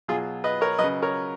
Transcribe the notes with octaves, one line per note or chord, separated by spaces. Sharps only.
B2 F#3 F4 G#4
B4 D#5
A#4 C#5
C#3 F#3 B4 D#5
A#4 C#5